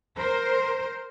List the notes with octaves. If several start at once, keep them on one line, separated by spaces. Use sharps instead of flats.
A#4 C5